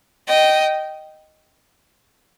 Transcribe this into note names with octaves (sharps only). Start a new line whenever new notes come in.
D#5 G5